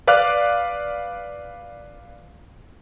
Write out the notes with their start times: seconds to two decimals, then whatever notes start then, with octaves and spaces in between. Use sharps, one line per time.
0.07 B4 D5 F5 D6 F6 F#6